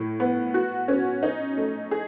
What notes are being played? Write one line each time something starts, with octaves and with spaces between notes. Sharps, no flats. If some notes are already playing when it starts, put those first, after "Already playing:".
Already playing: A2
B3
F#4
C#4
D#4
A3
G#4